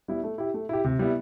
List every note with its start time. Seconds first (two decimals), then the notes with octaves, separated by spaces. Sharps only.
0.08 G3 B3 E4
0.23 A3
0.38 E4 G4
0.54 A3
0.69 E4 G4
0.85 C3
0.99 G3 B3 E4